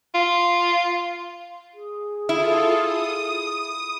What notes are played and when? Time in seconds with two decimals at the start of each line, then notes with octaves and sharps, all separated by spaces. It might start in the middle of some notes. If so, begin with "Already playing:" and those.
0.14 F4
1.74 G#4
2.29 E4 F4 A4
2.80 D#6